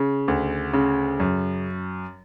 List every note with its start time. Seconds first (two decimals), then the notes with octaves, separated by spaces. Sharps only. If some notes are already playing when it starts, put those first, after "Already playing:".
Already playing: C#3
0.28 D2
0.73 C#3
1.20 F#2